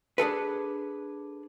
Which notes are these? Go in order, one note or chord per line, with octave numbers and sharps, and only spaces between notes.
D4 G#4 A4 B4